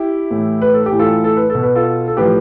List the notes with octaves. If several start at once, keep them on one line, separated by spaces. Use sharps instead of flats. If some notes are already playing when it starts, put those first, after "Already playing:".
Already playing: E4 G4
A2 E3
B4
A4
G4
A2 E3
F4 A4
A4
B4
B2 A4
B4
F4 A4
A4
A2 F3 G4 B4